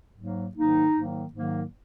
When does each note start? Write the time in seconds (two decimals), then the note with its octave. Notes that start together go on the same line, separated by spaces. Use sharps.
0.18 G#2 F#3 A#3
0.56 G#2 D#3 F#3 A#3 D#4
0.95 G#2 D#3 F#3 A#3
1.34 G#2 D#3 F#3 A#3